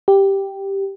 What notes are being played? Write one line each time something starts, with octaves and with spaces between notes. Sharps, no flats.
G4